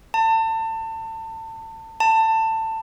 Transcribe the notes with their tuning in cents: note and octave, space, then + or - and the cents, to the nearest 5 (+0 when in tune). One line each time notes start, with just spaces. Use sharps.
A5 +30
A5 +20